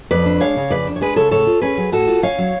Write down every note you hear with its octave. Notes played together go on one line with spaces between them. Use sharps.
F2 B4 D5
D4
G#3 C#5 F5
C#3
F2 B4 D5
D4
C#5
G#3 G#4 B4
C#3 A4 C#5
A2 A4 C#5
F4
C#4 G#4 B4
F#3
A2 F#4 A4
F4
C#4 C#5 F5
F#3